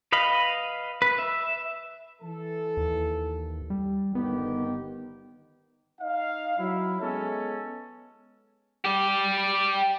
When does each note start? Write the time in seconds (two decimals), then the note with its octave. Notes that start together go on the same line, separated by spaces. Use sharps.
0.12 B4 D#5 F5 B5
1.02 B4
1.18 E5
2.22 E3 A4
2.77 D#2
3.70 G3
4.15 G1 D#3 B3 G4
6.01 D#4 D#5 F5
6.59 F#3 E4
7.01 G#3 B3 C#4 A4
8.85 G4 D5